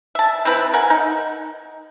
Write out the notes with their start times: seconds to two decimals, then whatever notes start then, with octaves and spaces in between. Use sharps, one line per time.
0.15 E5 A5
0.45 E3 C4 E4 B4
0.74 A#4 F#5 G#5
0.90 D#4